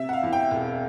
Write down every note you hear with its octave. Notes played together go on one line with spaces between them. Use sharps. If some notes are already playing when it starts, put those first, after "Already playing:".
Already playing: C3 E5
F#5
F5
E2
G5
E1